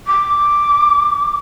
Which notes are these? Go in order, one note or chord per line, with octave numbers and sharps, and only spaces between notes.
D6